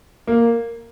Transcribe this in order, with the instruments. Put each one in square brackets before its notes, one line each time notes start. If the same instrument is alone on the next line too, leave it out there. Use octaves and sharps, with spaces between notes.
[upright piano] A#3